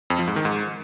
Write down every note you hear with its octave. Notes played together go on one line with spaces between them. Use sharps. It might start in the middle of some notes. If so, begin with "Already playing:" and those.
F2
F3
G#2
D#3
G#2